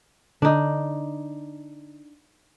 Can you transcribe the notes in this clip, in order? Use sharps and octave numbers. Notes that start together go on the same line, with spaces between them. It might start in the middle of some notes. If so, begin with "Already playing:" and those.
D3 D4 D#4